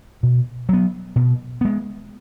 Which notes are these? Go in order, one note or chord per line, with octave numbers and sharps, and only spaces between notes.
B2
F#3 B3
B2
G#3 B3